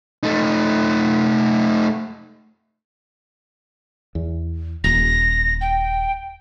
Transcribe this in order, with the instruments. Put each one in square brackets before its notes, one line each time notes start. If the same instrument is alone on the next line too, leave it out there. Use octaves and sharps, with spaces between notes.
[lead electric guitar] A3 D#4
[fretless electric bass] E2
[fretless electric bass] D#1 [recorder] A#6
[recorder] G5